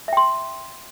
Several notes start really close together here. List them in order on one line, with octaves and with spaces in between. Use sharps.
E5 G5 C6